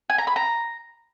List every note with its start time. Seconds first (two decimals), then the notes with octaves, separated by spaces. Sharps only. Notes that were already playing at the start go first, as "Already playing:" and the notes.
0.10 G#5
0.18 A#5
0.27 B5
0.36 A#5